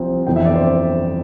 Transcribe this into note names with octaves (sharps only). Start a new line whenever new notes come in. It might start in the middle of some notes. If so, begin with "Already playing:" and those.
Already playing: C2 C3 F3 C4
G1 F2 E3 G5
E5
D5
C5